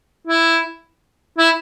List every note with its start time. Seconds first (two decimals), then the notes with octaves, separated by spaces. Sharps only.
0.27 E4
1.38 E4